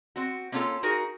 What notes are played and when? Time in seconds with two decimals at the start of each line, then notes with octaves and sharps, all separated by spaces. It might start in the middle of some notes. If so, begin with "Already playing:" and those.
0.16 C4 F#4
0.52 A#3 C4 C#4 D#4 F4 A4
0.83 D#4 F#4 G#4 A#4